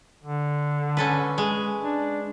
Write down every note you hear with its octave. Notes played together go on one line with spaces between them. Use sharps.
D3
C#4 A4 B4
G#3
D4